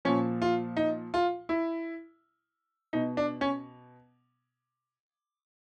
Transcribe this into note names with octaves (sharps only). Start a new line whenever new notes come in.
A#2 F3 C#4
F4
D#4
F4
E4
B2 D#4
D4
C#4